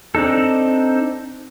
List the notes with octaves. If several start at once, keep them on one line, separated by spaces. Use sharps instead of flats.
C4 D4 D#4 A4